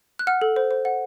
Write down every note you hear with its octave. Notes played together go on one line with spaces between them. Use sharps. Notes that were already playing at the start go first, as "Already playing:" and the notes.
F#6
F#5 F6
A4
C5
C5
F#5